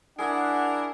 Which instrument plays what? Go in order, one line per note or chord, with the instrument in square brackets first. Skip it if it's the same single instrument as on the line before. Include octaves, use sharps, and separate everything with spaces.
[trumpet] D4 [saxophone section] E4 A#4 [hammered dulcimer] G#4 [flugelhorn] F#5